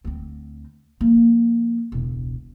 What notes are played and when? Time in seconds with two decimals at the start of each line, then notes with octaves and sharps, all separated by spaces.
0.04 D2 C4
1.01 F3 A#3
1.92 E1 C#2